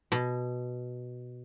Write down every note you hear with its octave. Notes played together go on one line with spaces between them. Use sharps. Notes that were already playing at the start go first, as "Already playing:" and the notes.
B2